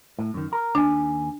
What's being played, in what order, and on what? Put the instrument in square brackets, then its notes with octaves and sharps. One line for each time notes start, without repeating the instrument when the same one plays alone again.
[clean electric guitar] A2
F#2 D#3
A#4
[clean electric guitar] D#2 G#5 [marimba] D4